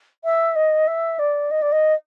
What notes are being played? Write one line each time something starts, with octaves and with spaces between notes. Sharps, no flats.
E5
D#5
E5
D5
D#5
D5
D#5